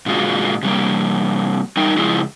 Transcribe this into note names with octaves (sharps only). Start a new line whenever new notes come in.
A#2 D3 G#3 F4 F#4
C3 G3 A#3
G3 D#4 A#4 G5
C#3 F3 G#3 E4